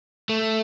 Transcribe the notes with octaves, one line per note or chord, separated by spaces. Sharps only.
A3